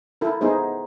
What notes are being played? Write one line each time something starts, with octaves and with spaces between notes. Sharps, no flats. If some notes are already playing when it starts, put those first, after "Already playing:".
E4 A4 A#4
B3 D#4 G#4 C5